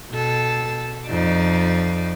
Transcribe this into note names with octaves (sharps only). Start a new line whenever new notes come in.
B2 A4
F2 D#4 D5